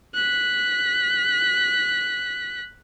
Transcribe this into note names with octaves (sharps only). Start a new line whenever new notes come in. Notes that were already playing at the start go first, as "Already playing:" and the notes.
F#6 B6